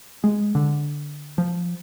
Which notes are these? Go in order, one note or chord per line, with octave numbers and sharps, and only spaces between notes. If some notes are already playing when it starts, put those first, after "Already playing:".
G#3
D3
F3